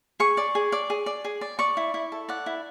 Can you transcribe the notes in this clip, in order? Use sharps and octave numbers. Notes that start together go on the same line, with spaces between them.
G#4 C#6
D5
G#4
D5
G#4
D5
G#4
D5
D5 C#6
E4
E4
A4
D5 F#5
E4